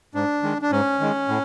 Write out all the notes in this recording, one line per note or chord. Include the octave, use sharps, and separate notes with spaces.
G#2 D4
D#3 G#3
D4
G#2 C#4
D#3 G#3
A2